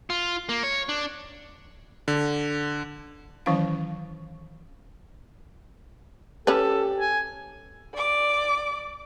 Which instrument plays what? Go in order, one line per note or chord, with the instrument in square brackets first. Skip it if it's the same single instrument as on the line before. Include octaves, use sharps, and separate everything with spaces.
[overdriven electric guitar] F4
A#3
C#5
D4
[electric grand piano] D3
[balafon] D#3 E3 F#3 C#4 E4 F5
[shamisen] C#4 B4 [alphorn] G4 [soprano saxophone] A4
[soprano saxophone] G#5
[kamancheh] D5 D6